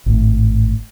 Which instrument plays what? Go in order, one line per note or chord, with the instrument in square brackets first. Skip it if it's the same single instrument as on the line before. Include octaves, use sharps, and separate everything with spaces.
[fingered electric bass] G#1 A2